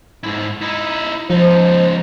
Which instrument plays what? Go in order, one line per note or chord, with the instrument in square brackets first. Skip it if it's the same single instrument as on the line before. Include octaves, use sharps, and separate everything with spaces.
[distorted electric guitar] G#2 E4
D#4 E4
[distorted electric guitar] C#2 D#4 [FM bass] F3 [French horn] C5